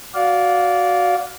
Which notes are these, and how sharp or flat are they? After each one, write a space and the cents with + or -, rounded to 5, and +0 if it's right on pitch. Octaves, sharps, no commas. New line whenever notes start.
F#4 +0 D5 -20 F5 +10